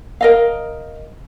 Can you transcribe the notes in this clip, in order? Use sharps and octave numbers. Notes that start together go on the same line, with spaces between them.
A#4 D#5 F5